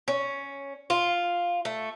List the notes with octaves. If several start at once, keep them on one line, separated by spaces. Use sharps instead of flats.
C#4
F4
A3